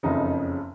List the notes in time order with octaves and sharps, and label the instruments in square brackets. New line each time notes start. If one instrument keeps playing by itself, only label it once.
[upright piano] F#1 F2 C#3 F3 D#4